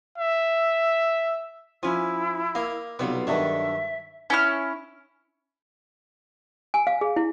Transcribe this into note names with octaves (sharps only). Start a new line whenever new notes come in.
E5
F3 C#4 E4 G#5
A#3 D#5 F5
B1 C3 G3 B3 F4
G2 D#3 F#3 D4 A4 D#5 E5
C#4 E4 F6
G#5
F5
G#4
E4